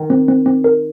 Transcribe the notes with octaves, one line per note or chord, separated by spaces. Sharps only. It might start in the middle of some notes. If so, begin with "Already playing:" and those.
Already playing: D#3
C4
C4
C4
A#4